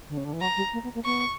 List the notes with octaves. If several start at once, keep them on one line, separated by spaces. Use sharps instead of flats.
D3
C#3
D3
E3
F#3 A#5
G3
A#3
B3
A#3
B3 C#6